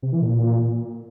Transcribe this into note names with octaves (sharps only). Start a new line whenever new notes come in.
C3
E3
A#2